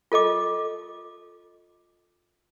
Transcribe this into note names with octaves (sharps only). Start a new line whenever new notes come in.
F4 A4 D#5 D6